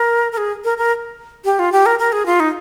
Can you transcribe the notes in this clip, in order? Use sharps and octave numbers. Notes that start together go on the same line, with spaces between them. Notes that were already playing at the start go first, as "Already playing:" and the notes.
Already playing: A#4
A#4
G#4
A#4
A#4
G4
F4
G4
A#4
A#4
G#4
F4
D#4